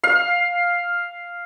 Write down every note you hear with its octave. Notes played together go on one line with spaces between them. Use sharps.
F5